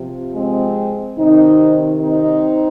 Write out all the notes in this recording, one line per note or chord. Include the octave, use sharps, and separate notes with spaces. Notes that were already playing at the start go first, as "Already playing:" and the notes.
Already playing: C3 F3
G#3 C4
C3 D#3 C4 D#4
C4 D#4